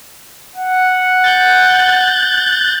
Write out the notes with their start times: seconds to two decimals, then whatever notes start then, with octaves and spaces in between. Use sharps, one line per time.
0.56 F#5
1.24 F#6 G6 A6